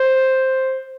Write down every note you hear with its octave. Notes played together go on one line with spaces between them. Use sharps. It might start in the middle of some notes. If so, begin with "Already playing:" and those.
Already playing: C5